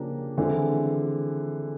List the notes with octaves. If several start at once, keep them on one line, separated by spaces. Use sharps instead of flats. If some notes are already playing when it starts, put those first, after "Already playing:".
Already playing: C#3 F3 A#3 D4 G4
D3 E3 F3 G#3 C4